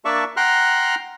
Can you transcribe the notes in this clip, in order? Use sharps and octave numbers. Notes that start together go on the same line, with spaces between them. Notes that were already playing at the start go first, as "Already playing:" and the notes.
A#3 D4 D5 E5 A5 C#6
F#5 G5 A#5 C6 F6 F#6